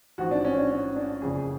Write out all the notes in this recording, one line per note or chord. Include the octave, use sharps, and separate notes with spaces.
A1 G#2 F3 F#4
D4
C#4
D4
C#4
D4
F#1 F2 C#3 G#4